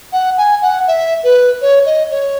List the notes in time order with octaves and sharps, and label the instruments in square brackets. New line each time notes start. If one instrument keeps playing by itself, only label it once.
[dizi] F#5
G#5
F#5
E5
B4
C#5
D#5
C#5